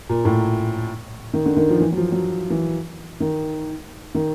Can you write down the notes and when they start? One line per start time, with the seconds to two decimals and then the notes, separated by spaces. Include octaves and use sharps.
0.09 A#2
0.25 A2
1.34 D#3
1.46 D3
1.57 D#3
1.69 F3
1.80 E3
1.92 F#3
1.97 F3
2.12 F#3
2.50 E3
3.20 D#3
4.15 D#3